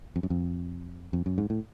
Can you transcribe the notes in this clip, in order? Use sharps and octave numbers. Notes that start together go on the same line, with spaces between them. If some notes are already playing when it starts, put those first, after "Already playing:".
F2
F#2
F2
F2
F#2
G#2
A2